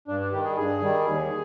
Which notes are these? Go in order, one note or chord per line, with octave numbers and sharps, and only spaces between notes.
G2 D4
D4
D#3 G3 G4
G#4
G2 G#4
D#3 G3
D#2